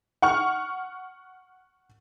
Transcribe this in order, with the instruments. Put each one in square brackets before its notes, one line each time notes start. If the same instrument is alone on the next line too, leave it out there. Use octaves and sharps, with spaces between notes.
[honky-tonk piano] F#5 C#6 F6